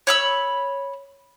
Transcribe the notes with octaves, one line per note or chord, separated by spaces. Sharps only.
C#5 B5 E6